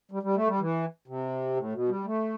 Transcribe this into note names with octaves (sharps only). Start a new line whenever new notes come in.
G3
G3
A3
G3
E3
C3
A2
B2
G3
A3